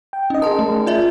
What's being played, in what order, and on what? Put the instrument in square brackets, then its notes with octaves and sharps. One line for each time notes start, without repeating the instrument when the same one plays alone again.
[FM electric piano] G5
[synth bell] C#4 [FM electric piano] D#4 D#5
[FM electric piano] G#4 A#4 [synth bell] A5 C6
[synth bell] A3
F4 D5 E5